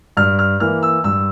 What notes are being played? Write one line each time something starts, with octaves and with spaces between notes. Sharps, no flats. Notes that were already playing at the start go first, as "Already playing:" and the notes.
G2 F6
F6
E3 A#3 F6
E6
G2 E6